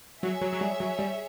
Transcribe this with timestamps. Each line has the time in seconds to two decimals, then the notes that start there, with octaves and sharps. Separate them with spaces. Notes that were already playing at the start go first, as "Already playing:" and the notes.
0.22 F#3 G#4 C#5 E5
0.41 F#3
0.53 F#3
0.61 G3
0.80 F#3
0.99 G3